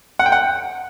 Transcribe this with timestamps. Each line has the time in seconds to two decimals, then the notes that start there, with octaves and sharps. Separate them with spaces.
0.19 F#5
0.26 G5
0.32 F#5